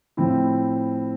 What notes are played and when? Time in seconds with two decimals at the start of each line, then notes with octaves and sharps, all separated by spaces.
0.17 A2 F3 C4 E4